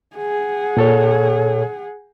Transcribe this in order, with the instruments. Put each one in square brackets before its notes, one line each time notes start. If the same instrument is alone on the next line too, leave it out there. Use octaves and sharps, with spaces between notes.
[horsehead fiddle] G#4 F#5
[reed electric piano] A#2 A4 C#5